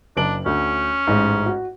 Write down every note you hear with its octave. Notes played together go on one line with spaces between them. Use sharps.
F#1 D4 D7 F#7
D2 C#4
A1 G#2
F#4